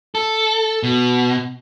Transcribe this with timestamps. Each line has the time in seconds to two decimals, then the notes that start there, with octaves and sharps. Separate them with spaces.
0.15 A4
0.83 B2